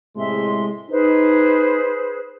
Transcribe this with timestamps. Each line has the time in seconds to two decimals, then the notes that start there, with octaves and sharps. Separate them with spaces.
0.17 A2 C3 G#3 E5 C6
0.90 D#4 G#4 B4 C5